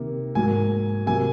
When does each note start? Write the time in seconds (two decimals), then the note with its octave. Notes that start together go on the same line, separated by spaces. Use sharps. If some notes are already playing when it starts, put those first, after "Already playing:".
Already playing: C3 D#3 A#3
0.35 G#2 F#3 A#3 G#5
1.06 C3 F#3 A#3 G#5